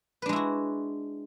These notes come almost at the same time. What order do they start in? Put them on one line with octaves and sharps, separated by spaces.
B4 D4 G#3 E4 F#4